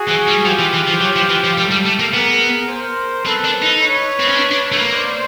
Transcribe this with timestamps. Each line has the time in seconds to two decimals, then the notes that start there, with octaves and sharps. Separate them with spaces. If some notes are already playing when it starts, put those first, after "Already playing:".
Already playing: F#4 G#4
0.09 E3
0.28 G3
0.45 F3 F4 G4
0.59 E3
0.74 E3
0.88 F3
1.01 F#3
1.16 F3
1.30 E3
1.44 F3
1.57 G3 G4 A4
1.71 G3
1.86 A3
1.99 A#3
2.13 B3 G#4 A#4
2.69 A#4 C5
3.25 C4 A4 B4
3.44 D4
3.62 D#4
3.81 B4 C#5
4.20 C4
4.28 C#4
4.36 D4
4.51 D4
4.72 A3
4.78 A#3
4.93 C5 D5